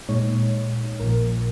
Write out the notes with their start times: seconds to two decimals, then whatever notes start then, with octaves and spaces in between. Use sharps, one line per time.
0.09 A#2 G#3 D#4 C#5
1.00 A#1 A#2 F3 A#4